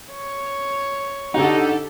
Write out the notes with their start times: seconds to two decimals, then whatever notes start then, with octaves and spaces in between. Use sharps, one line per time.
0.12 C#5
1.34 D3 C#4 D#4 F#4 G4 A4